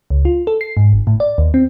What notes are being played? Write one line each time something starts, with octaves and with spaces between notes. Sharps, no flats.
C#2
F4
A4
C7
G#2
G1
A2
D5
D#2
C4